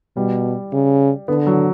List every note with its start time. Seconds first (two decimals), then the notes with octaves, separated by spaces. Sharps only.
0.17 B2 G3
0.72 C#3
1.28 D3 B3
1.47 F#3